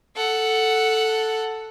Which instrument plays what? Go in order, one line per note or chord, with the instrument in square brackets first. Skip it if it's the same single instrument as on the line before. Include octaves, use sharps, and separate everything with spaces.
[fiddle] A4 F#5